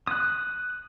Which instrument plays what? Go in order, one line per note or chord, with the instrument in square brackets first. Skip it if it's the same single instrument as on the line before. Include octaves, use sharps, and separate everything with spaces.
[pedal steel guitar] D#6 F#6